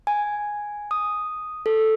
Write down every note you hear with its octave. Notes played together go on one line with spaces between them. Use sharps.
G#5
D#6
A4